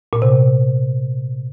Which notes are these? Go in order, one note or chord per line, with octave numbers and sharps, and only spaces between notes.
A#2
C3